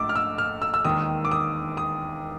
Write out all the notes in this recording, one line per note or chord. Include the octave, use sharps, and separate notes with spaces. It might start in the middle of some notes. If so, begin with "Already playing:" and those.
Already playing: A#1 G#2 A3 D6 E6
F6
E6
F6
E6
E6
E1 D#2 D#3 D#6
D6
D#6
D#6